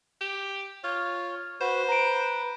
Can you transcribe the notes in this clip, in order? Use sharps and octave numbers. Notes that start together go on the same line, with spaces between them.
G4
F4 C#5
F#4 B4 C5
B4 A#5 D7